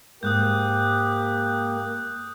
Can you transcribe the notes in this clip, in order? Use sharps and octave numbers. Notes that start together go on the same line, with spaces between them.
G#2 A#3 G4 D#6 F#6 G6